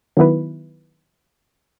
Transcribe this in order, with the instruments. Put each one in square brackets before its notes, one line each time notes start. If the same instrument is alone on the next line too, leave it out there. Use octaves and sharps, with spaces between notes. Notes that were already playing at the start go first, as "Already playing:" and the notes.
[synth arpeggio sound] D#3 F#3 B3 E4 B4